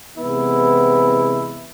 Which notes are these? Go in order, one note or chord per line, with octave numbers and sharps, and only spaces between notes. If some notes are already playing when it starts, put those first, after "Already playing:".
C3 E3 G#3 B3 E4